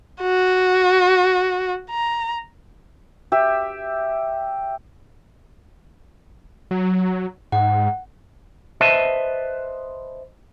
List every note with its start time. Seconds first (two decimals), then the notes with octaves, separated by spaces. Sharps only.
0.22 F#4
1.91 A#5
3.32 G4 E5
6.71 F#3
7.52 G#2 F#5
8.81 B4 C5 D#5 E5 A5